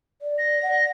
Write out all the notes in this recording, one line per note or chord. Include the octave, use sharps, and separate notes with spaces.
D5
A#6
F#5